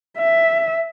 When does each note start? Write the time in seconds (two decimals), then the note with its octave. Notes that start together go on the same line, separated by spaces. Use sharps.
0.18 E5